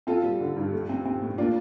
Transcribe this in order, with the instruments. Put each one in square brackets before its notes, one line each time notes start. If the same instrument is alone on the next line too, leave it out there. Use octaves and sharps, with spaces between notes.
[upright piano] C4 F4 A4
G3
D3
G2
A3
C4
C4
A2
A#3 D4 F4